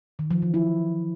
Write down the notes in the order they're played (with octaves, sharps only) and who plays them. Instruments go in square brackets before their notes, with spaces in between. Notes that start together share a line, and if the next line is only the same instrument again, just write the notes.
[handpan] D#3
F3
E3
E4